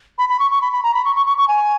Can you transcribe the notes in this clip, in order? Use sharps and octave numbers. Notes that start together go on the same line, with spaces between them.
B5
B5
C#6
C#6
B5
B5
A#5
B5
C#6
C#6
C#6
C#6
G#5